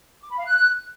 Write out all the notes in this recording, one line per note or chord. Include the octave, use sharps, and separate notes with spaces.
D6
B5
F5
F#6